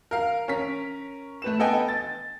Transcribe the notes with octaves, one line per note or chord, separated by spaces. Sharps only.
A#4 F5
C#4 A#4 B6
A3 B4 E7
B3 A4 B4 D#5 G5 G#5
A6